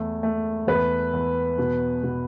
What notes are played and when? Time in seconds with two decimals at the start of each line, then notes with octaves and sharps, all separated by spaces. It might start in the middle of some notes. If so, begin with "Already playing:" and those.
Already playing: E2 A3
0.23 A3
0.67 E2 B4
1.13 E2
1.58 B2
2.03 B2